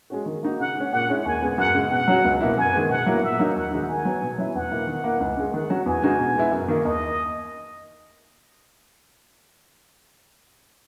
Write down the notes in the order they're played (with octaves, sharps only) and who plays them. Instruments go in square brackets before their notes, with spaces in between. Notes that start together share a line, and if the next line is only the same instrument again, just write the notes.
[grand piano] G#3 C#4 F#4
D#3
A#3 D#4 F#4
[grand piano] C#3 [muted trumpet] F#5
[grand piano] G#3 C#4
[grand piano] A#2 [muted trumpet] F#5
[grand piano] G#3 C#4 E4
[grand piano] D#2 [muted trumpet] G#5
[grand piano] C#3 G#3 B3
[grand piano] F#2 [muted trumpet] F#5
[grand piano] C#3 G#3
[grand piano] B2 [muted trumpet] F#5
[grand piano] F#3 C#4 F#4
C#2
B2 A#3 E4
[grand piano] F#2 [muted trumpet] G#5
[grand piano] D#3 G#3 B3
[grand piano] B2 [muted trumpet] F#5
[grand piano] F#3 A#3 E4
[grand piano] A#2 [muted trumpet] E5
[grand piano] F#3 A#3 D#4 F#4
[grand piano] D#2 [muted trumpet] F#5
[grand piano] D#3 G#3 D#4 F#4
[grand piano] D#3 [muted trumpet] G#5
[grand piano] F#3 B3
B2
F#3 C#4 E4
[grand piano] E2 [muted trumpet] F#5
[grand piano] B2 A#3 E4
D#3
A#3 E4
C#2
C#3 G#3
[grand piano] D#3 [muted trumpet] F#5
[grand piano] F#3 C#4 F#4
[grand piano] E2 [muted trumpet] G#5
[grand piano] C#3 G#3 D#4 F#4
B2
G#3 B3 E4
F#2
D#3 A#3
[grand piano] D#2 [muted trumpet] D#5